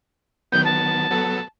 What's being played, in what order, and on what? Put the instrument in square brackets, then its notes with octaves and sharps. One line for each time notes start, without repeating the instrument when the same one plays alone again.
[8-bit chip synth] D#3 F#3 B3 [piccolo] G6
[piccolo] A5
[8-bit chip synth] F#3 B3 A4